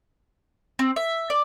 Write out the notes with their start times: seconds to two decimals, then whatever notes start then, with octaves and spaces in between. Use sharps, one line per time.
0.79 C4
0.96 E5
1.30 D5